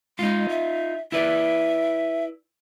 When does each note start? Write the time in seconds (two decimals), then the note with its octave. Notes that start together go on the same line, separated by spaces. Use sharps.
0.19 G#3 D#4 F4
0.49 E5
1.12 E4 B4 D5 E5